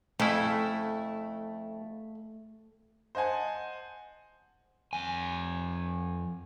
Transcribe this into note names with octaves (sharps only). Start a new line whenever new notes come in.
F2 C#3 A3 E4
C5 D#5 F#5 G#5 A5
F2 G#5